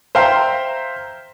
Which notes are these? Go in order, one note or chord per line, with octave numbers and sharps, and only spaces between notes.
C5 E5 F5 G5 A#5 C6